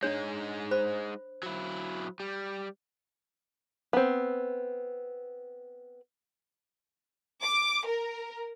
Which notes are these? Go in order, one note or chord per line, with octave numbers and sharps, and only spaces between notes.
G#3 D4 D#4 C#5
C5 B5
F#3 E4
G3
B3 C4
D6
A#4